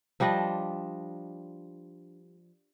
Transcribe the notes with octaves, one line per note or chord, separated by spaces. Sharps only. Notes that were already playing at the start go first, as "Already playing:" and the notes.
F3 G3 D4 D#5